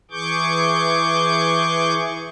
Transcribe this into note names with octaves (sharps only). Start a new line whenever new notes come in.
E3 G#4 C#6 D6 G6